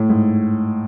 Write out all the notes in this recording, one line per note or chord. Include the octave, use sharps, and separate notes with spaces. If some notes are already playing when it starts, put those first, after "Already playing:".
Already playing: A2
G#2